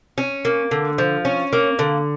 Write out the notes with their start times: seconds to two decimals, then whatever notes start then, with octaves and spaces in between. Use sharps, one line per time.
0.18 C#4
0.45 A#3
0.71 D3
0.98 F3
1.25 C#4
1.53 A#3
1.79 D3